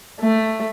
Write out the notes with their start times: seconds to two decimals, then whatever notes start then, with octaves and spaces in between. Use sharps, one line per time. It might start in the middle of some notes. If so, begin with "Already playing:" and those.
0.20 A3